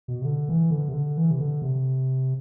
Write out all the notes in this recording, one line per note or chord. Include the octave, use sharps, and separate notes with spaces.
B2
C3
D3
E3
D3
C3
D3
E3
C3
D3
C3